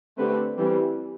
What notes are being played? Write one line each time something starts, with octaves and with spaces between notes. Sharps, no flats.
D3 A3 C4 G4 B4
E3 G3 C4